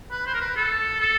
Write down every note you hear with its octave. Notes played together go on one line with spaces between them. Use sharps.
B4
C5
A#4
B4
A4
A4